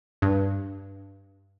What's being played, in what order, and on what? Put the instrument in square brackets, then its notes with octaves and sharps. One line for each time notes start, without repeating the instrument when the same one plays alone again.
[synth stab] G2